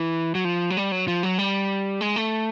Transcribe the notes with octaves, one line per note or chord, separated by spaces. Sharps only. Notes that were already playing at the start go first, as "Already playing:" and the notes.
Already playing: E3
F#3
F3
F#3
G3
F#3
F3
F#3
G3
G#3
A3